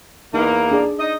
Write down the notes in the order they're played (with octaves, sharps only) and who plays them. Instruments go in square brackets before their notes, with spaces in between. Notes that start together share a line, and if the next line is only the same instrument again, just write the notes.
[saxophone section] E2 A#3 [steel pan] D#4 B5
[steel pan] D4 G#4 D5
[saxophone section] D#4 D#5